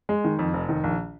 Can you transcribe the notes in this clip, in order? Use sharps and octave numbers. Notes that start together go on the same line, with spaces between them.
G#3
D#3
F2
F1
D#3
A#1